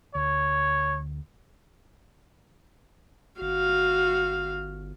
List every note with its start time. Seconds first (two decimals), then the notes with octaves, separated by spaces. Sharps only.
0.15 D2 C#5
3.41 G1 F#4 F5